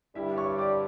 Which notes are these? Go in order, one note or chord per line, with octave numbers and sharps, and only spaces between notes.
G2 D3 G3 E4 E5
C#5 C#6
D5 D6